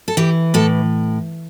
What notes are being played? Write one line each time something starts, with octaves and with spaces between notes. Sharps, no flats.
A4
E3 G4
A2 A4